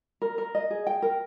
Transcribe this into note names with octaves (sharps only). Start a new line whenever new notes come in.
A#4
A#4
D#5
G#4
G5
A#4